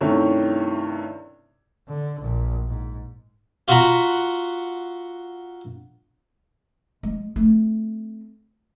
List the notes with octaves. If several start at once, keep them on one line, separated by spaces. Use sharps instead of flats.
G2 C3 D#3 A3 C#4 E4
D3
A#1
G#2
F4 F#4 E5 F#5 A#5 B5
G#3
A3 C4